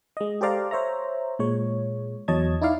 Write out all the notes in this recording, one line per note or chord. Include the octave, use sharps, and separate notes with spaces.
G#3 D#5
G4 A4 C5 D5 F5 A#5
C5 C#5 E5 A#5
A#2 G#3 C#5
E2 F#3 C#5 D#5 A5 G#6
D#4 E4 D5 F5